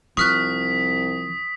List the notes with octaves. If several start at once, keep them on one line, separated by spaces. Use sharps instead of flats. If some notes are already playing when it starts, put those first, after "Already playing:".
C2 F3 C#6 D#6 F6 F#6 B6